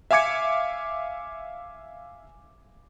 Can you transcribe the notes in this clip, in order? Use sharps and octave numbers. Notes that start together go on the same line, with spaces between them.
E5 F5 G#5 D6 G#6 C#7